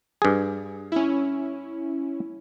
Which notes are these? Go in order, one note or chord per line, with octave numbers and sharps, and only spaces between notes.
G2 G#4
C#4 E4